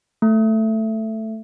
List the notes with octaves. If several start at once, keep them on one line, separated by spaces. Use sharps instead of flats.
A3